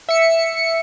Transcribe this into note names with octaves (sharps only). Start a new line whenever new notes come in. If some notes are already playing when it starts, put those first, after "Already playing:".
E5 C#7